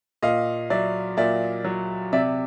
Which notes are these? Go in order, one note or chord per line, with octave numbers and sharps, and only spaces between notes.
A#2 D#5 F5
F#3 D5 E5
A#2 D5 E5
F#3
C3 D5 E5